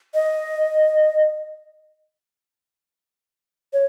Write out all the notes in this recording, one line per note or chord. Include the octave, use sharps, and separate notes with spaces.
D#5
C#5